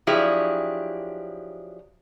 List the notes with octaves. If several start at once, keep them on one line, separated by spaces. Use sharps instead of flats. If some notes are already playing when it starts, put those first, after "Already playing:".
F3 F#3 D4 E4 G4 G#4